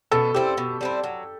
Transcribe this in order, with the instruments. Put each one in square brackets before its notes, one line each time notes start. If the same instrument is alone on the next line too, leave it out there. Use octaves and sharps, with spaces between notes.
[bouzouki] B2 [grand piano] A4
[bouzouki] G3 C4 E4 [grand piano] G4
[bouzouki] B2
G3 C4 E4
F#3